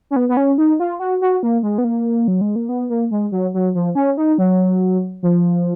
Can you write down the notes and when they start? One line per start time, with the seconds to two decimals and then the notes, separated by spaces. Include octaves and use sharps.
0.11 C#4
0.16 B3
0.29 B3
0.37 C#4
0.58 D#4
0.80 F4
1.00 F#4
1.21 F#4
1.43 A#3
1.63 G#3
1.78 B3
1.84 A#3
2.28 F#3
2.41 G#3
2.56 A#3
2.69 B3
2.90 A#3
3.11 G#3
3.32 F#3
3.54 F#3
3.75 F3
3.95 C#4
4.17 D#4
4.38 F#3
5.23 F3